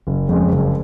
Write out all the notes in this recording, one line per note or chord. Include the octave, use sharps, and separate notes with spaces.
F#1
F2 C#3 G#3
F#1